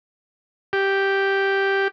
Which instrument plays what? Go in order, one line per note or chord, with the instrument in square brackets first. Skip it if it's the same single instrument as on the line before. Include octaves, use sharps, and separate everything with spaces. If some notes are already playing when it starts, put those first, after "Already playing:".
[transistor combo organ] G4